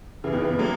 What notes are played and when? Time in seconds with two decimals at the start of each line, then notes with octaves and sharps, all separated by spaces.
0.24 C#3 E3
0.32 B2 D#3
0.42 C#3 E3
0.50 B2 D#3
0.59 F#3 A#3